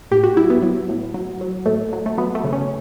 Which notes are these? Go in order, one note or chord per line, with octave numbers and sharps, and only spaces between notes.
A2 G4
F#4
F#3 E4
B3
F#3
A2
F#3
F#3
A2 A3
F#3
A3
F#3 B3
A3
C#3
C#4